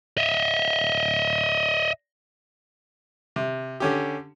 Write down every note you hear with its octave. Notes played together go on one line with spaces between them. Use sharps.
D#5 E5
C3
D3 C#4 G4